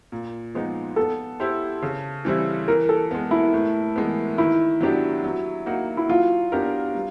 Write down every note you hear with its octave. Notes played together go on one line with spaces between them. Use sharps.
A#2
F3 G#3 B3 D#4
B3 A4
E4 G4 C5
C#3
E3 G3 C4 E4
E3 A#4
A4
G#3 B3
E4
A2
E3 G#3 B3
D#3 E4
F#3 B3 D4 G4
F#3
A#3 D#4 F#4
E4
F#3 F4
B3 D4 G4 A#4
G3